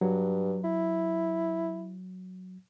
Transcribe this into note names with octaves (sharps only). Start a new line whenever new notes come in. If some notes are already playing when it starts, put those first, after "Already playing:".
G2 F#3
E4